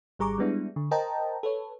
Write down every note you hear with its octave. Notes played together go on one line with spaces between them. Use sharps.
G#1 G3 G#4 A#5 C#6 D6
G3 G#3 B3 D4 E4
D3
A#4 C5 D#5 G5 A5 A#5
A4 B4 C#5